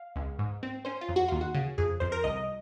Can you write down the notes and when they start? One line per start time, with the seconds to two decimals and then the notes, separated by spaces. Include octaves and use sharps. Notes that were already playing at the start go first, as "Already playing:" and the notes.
Already playing: F5
0.16 C#2
0.39 G#2
0.63 C4
0.85 C#4 C5
1.01 F4
1.08 F2
1.16 F#4
1.28 D#2 F4
1.41 F#4
1.54 C#3
1.78 F2 G#4
2.00 F2 C5
2.12 A#4
2.24 C2 D#5